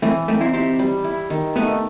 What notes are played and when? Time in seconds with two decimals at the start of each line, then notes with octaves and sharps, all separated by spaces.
0.02 E3 A3 C4
0.28 A3 C4 D#4
0.41 C4 E4
0.53 C4 E4 G4
0.79 G3
1.04 E4
1.30 D#3
1.56 A3 B3 D#4